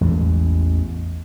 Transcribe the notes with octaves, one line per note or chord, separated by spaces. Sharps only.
A1 E2 G#3